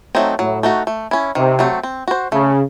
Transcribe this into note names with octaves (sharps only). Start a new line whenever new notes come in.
F#3 A3 C4 D#4
A2 F#3
A3 D#4 F#4
A3
C#4 E4
C3 D#3
F#3 A3 C4
C4
F#4 C5
C#3 A3